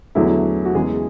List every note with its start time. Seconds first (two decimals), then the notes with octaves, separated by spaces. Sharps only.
0.15 E2 D3 F#3 A3 E4
0.65 F#4
0.75 E2 C#3 E3 G#3 G#4